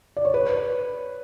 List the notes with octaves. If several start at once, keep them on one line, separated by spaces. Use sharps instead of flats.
D5
C#5
B4